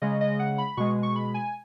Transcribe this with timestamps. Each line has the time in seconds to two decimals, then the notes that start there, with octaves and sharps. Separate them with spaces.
0.02 C#3 G#3 D#5
0.21 D#5
0.39 F#5
0.58 B5
0.77 B2 G#3 C#6
1.03 C#6
1.16 B5
1.34 G#5